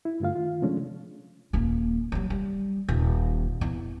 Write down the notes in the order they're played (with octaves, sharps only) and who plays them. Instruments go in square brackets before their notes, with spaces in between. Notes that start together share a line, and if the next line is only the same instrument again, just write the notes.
[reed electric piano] E4
G2 D3 A3 F4 F5
D#3 F4
C3 F3 G#3 A3 C#4 D4
[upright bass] D#1 A#3
F#3 G3
G3
D#1
E2